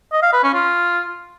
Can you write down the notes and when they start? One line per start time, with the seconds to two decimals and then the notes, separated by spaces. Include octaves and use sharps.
0.12 D#5
0.23 F5
0.33 B4
0.43 C#4
0.54 F4